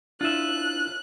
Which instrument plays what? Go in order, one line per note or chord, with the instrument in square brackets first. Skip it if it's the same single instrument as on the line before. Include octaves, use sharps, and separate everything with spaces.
[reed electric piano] D4 E4 [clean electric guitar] F4 E5 [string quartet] F#6